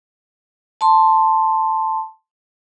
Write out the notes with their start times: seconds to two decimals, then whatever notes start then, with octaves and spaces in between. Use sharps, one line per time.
0.81 A5 C6